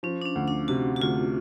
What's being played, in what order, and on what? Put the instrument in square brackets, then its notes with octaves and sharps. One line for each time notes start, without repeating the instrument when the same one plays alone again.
[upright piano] F3 [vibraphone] C#4
[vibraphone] D4
C#4
[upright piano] D2
[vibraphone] D4
[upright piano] C3 [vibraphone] F#4
[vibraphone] F#4
[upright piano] D2 [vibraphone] F4